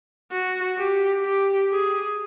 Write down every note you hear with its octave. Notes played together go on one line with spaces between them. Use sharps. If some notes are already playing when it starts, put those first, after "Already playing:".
F#4
G4
G4
G#4